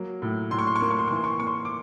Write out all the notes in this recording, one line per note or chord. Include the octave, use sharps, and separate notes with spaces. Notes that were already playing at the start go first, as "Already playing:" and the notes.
Already playing: F#3 A#3
A2
A2 C6
C#6
C6
C#6
A#3 C6
C#6
C6
E3 C#6
C6
C#6
C6
A#3 C#6
C6
D6